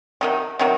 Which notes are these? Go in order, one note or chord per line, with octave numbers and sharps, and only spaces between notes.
C3 D#3 F#3
C3 D#3 F#3